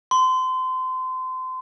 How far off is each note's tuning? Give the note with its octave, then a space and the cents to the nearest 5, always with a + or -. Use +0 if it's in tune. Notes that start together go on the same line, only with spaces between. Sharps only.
C6 -30